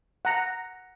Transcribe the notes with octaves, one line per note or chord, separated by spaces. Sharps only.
F#5 A#5